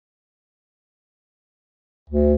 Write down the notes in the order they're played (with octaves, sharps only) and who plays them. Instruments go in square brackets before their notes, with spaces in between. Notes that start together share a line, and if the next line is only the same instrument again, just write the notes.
[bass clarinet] D2